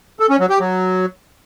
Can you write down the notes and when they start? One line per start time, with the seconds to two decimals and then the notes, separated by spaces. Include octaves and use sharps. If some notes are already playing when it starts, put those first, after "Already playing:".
0.20 A4
0.30 C#4
0.40 F#3
0.50 G4
0.60 F#3